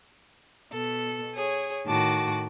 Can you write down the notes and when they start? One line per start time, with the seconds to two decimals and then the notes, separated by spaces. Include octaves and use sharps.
0.72 B2 A4
1.36 G#4 C#5
1.85 A2 D#3 F#4 A5 D6